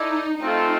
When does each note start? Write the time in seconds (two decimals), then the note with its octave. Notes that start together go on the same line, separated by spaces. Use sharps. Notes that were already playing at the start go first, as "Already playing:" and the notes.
Already playing: D#4 E4 A4 D5
0.40 A3 C4 D#4 F4 A4